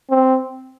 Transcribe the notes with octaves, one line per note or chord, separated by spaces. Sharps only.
C4